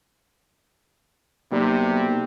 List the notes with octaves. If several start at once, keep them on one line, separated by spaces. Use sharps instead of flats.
B1 C3 G3 A#3